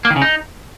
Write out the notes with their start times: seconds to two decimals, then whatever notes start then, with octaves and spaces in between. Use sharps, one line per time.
0.05 A#3
0.10 D#3
0.16 C#3
0.22 D#4